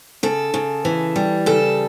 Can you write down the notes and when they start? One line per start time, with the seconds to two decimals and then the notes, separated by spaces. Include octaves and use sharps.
0.23 C#3 A4
0.54 C#3
0.85 E3
1.16 G3
1.46 C#3 A4